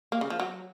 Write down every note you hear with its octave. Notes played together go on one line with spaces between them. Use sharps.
A#3
C#3
F3
F#3